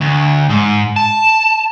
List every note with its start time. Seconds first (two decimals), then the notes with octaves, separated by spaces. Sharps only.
0.01 D2
0.49 G#2
0.96 A5